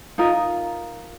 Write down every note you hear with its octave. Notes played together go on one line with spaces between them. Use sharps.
D#4 F4 A#4 D#5